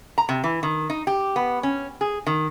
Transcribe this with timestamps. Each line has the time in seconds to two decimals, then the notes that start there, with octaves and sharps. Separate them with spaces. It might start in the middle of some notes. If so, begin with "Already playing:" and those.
0.18 A#5
0.29 C3
0.44 E3
0.63 D#3
0.90 D#4
1.07 G4
1.36 B3
1.63 C#4
2.01 G#4
2.27 D#3